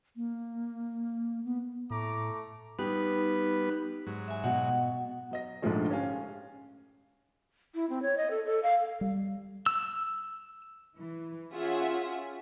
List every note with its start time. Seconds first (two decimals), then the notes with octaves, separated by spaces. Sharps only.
0.16 A#3
1.45 B3
1.90 A2 A3 A#5 D6
2.79 G3 B3 D#4 G4 B4
4.07 G#2 F#3
4.28 E5 G#5
4.44 B2 F#5
5.31 F#3 D#5 A#6
5.62 A#1 G#2 D3 F3 G#3 A3
5.91 C#4 G4 F5 G#5
7.75 E4
7.90 C4
8.02 C#5
8.17 D#5
8.31 A4
8.46 A4
8.63 F5
9.01 G3
9.66 E6
10.97 E3
11.52 C#4 F4 F#4 G#4 E5 F#5